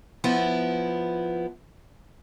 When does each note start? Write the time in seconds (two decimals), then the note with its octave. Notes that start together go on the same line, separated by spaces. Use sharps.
0.24 F3 B3 E4